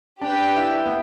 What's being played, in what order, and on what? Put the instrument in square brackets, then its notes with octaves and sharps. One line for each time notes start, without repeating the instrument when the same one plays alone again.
[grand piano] D4 [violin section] G4 B4 G5
[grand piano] E4
B3